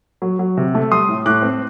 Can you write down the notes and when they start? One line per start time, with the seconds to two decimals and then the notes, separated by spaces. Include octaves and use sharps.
0.22 F#3
0.39 F#3
0.57 C3
0.75 A3
0.91 G3 C6 D#6
1.09 A2
1.26 A2 D6 F#6
1.42 C4